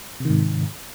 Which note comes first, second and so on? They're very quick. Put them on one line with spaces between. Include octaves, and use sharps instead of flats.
C3 D#3 G#2